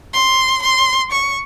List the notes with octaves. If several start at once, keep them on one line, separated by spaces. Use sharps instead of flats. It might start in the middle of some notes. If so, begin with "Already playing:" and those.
C6
C6
C#6